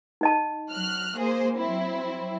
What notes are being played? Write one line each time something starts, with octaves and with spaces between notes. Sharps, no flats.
D#4 D#5 A5
F#3 F6 F#6
A#3 G#4 C5
F#3 C4 E4